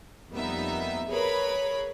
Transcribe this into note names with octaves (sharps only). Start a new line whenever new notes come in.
F2 G3 A#3 B3 D#4 E5
G#4 A#4 B4 C#5 B5